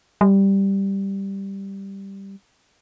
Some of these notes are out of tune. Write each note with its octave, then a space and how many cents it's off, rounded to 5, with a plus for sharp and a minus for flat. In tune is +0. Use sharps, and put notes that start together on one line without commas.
G3 +0